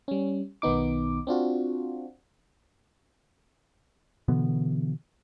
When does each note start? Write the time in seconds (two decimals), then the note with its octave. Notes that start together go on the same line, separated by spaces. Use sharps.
0.08 G3 C#4
0.62 B1 D#3 B3 D#4 D6
1.27 C4 D4 F4 F#4
4.28 B2 D3 E3 B3